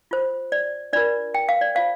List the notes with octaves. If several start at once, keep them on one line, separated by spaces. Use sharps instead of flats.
F4 C5
D5
D4 F4 A#4 D5
G5
F5
D5
F4 C5 F5